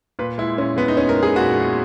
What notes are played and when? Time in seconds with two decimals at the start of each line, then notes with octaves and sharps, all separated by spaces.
0.19 A#2 B4
0.38 G#3 E4
0.58 A#2 C#4
0.77 G#3 B3
0.88 D#4
0.97 A#2 C#4
1.09 A#4
1.15 G#3
1.23 G#4
1.36 A#2 F#4
1.55 G#3